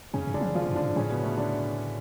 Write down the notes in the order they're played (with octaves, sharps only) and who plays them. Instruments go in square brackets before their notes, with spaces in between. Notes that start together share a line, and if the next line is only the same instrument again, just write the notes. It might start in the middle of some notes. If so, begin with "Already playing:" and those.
[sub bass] F2 [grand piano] C#3 C#4
[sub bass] F#2
[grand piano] D3 D4
[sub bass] F3
[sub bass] C#3 [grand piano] F3 F4
[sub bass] F#2
[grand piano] D3 D4
[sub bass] G#2
[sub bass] A2 [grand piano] C#3 C#4
[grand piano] B2 B3
A3
D3 D4